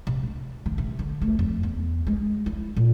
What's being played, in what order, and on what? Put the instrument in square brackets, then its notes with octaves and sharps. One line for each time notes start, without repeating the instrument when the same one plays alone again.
[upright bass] C3
D4
D#3
C3
D3
A3
F2
E2
G#3
E4
A#2